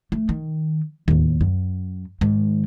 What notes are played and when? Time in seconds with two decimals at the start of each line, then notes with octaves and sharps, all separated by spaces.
0.12 A3
0.29 D#3
1.08 D#2 A2
1.41 F#2
2.21 G#2 D#3